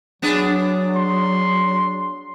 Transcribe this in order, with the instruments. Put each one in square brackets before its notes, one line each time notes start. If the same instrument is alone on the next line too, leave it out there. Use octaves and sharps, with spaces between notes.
[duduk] F#3 [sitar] B3 D4 G#4
[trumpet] C6